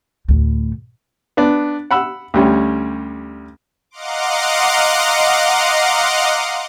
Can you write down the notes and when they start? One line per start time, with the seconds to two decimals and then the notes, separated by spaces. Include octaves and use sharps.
0.28 D2 A2
1.37 B3 D4
1.91 F#5 B5 E6
2.34 D2 G3 C#4
3.91 D#5 F5 F#5 A#5 C6 D6